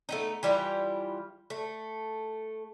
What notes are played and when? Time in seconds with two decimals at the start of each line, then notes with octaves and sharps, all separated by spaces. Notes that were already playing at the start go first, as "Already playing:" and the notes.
0.09 A3 B3 D#4
0.43 E3 G3 E4 F4
1.50 A3